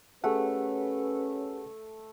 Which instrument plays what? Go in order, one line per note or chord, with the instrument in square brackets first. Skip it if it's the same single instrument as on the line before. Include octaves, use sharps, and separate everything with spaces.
[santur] A3 [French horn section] C#4 B4 [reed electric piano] G4 G#4 F#5